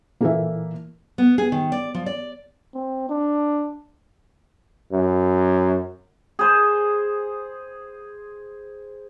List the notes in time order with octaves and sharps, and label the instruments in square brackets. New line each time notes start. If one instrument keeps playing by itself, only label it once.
[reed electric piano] A#2 E3 [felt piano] A#3 A4 E5
[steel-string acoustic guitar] B3
G#4
D#3
D5
F3
D5
[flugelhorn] C4
D4
[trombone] F#2
[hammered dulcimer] G#4 C5